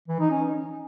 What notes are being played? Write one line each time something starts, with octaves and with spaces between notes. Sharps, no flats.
E3
D#4
C#4